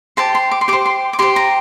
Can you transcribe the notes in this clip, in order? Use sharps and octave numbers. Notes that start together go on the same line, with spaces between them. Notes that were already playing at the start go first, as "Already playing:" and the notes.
G4 C5 A5
C6
D6
C6
G4 C5 D6
C6
D6
G4 C5 C6
A#5